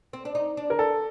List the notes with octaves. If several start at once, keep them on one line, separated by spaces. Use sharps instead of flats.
C4
D4
D#4
D4
A#4
A4